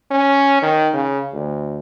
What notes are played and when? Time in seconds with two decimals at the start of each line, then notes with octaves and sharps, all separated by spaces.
0.11 C#4
0.62 D#3
0.93 C#3
1.33 D2